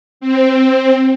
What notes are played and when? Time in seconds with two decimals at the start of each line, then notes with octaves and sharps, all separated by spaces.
0.21 C4